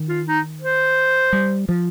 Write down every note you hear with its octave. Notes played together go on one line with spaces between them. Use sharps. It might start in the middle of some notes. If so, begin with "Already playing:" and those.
Already playing: D#3
F4
D#4
C5
G3
F3